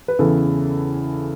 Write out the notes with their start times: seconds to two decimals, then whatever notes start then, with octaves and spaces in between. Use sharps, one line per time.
0.08 B4
0.19 E2 C#3 E3 A4